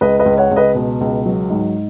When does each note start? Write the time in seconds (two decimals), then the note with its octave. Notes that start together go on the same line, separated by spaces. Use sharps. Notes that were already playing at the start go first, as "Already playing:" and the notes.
0.01 C#2 B4 D#5
0.20 B4 D#5
0.26 C#2
0.38 C#5 F#5
0.51 C#2
0.56 B4 D#5
0.75 B2
1.01 C#2
1.26 F#3
1.50 G#2